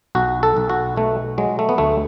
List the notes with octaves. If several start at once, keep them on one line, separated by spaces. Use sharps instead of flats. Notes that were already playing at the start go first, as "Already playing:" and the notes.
B1 F#4
A4
B1
F#4
B2 A3
F#3 G#3
A3
B3
D2 A3